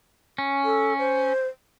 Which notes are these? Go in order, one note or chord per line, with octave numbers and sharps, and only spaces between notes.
C#4
A4
C5